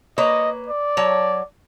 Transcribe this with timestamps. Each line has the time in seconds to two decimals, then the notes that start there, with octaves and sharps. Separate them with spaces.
0.18 A#3 B4 C#5 D#5
0.68 D5
0.97 F#3 C#5 A5